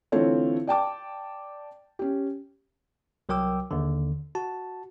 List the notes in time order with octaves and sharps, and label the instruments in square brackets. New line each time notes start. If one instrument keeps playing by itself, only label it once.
[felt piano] D3 E3 A3 C4 F4 C#5
D5 G5 A5 D6
C#4 G4
[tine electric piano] C2 F#3 A#4 G5 D6 E6
D#2 D3
F#4 A5